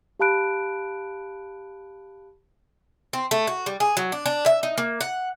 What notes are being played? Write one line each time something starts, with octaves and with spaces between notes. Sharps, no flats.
G4 F5 A5 B5 F#6 D7
C4
A3
F#4
G3
G#4
F#3
D4
D4
E5
D#4
A#3
F#5